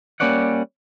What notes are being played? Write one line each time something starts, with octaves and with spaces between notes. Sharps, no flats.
G3 A#3 C#4 C#5 D5 F#5